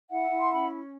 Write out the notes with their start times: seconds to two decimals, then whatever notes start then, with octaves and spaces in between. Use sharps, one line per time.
0.09 E4 E5 F#5
0.30 E4
0.38 C6
0.50 C#4 B5